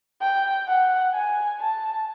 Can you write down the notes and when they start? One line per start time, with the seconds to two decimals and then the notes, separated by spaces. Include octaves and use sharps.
0.21 G5
0.68 F#5
1.14 G#5
1.61 A5